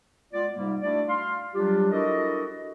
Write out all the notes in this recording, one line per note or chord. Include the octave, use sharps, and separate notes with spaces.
G#3 B3 F4 D5
G#2 C3 G3 A#3
A3 D4 E4 F#4 D5
F5 C6
F#3 G3 D4 F4 G4
D4 E4 F#4 A4 A#4 D#5